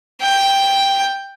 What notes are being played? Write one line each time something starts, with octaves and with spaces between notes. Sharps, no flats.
G5